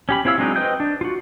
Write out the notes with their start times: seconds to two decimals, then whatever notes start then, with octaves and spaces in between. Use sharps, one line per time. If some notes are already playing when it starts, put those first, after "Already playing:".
0.09 C#4 G4 B5
0.25 C4 E4 C#5 F5 E6
0.38 F#3 G#3 C4 D4 D#4
0.56 B4 C5 D#5 G5 G6
0.80 D4
1.01 F4 F#4